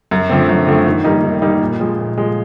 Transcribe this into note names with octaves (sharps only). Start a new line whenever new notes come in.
F#2
D3 F3 A3 C4
F#2
D3 F3 A3 C4
D#3
G3 A#3 D#4
D#3
G3 A#3 D#4
A#2
F3 G#3
A#2
F3 G#3